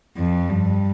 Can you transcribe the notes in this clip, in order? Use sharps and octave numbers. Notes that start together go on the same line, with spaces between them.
F2
G2